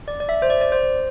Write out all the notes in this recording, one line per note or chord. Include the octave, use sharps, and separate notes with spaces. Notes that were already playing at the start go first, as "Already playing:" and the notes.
D5
D5
E5
C5
D5
D5
C5